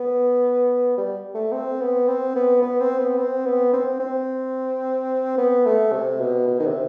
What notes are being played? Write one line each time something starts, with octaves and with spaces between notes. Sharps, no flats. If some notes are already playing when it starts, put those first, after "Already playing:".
Already playing: B3
G3
A3
C4
B3
C4
B3
B3
C4
B3
C4
B3
C4
C4
B3
A3
C3
B2
B2
D#3
C3